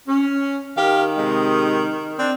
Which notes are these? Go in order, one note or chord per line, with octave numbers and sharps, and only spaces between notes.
C#4
D#3 G4 A#4 F5
C3 G#3
C4 D4